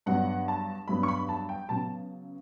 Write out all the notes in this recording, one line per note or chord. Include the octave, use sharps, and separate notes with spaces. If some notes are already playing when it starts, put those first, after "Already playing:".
G2 F#3 B3 D4 F#5
A5
G2 F#3 B3 D4 B5
C#6
B5
A5
G5
C#3 F#3 B3 A5